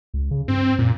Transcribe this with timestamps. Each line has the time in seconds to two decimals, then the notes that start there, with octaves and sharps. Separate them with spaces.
0.14 C#2
0.31 C#3
0.48 G2 C4
0.79 F#2 A#2